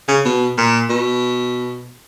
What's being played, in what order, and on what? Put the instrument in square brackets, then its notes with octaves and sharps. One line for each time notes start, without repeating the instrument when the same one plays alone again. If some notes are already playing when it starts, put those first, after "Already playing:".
[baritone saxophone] C#3
B2
A#2
B2